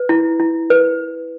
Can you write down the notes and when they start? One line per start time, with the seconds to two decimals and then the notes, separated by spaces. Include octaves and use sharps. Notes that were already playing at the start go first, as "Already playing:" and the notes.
Already playing: B4
0.09 E4
0.40 E4
0.70 B4